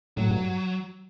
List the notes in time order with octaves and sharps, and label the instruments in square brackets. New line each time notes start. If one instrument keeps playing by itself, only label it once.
[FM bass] A2 [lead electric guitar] F#3
[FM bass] G2